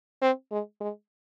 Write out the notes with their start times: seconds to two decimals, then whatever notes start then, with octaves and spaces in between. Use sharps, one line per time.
0.22 C4
0.51 G#3
0.80 G#3